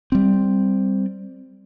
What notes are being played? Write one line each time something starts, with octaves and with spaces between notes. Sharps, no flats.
G3 C4